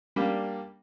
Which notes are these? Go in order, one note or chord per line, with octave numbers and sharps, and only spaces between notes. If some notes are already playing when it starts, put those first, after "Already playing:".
G3 A#3 D4 G4